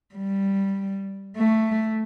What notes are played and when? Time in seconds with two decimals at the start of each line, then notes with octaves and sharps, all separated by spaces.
0.15 G3
1.37 A3